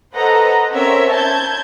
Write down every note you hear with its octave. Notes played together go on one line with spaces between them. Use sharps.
A4 B4 C5 D#5 F#5 A#5
C4 C#4 A#4 C5 C#5 E5
A5 G6 G#6